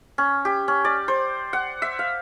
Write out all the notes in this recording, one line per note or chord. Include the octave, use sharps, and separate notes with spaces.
C#4
G4
C#4
D5
C5
F#5
E5
F5